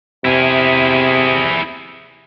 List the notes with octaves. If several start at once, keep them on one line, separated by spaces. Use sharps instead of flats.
C3 E4 G#4